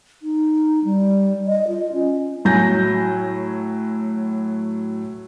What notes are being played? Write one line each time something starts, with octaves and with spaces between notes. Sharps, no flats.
D#4
G3
D#5
F4
C#4
A2 F#3 G#5 G6 A#6